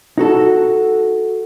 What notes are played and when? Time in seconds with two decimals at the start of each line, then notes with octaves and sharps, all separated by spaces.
0.18 D#4 F#4 A4